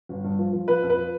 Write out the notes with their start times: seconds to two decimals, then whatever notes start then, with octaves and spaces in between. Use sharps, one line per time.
0.09 G1
0.24 G2
0.39 F3
0.53 F3
0.68 F3 B4
0.83 F2
0.90 B4
0.97 F3